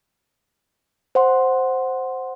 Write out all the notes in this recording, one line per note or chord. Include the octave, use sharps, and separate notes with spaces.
C5 F#5 C6